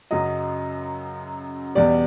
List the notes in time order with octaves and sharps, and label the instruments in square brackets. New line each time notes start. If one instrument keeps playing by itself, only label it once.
[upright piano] F#2 C#3 F#3 D#5
E2 B2 G3 D5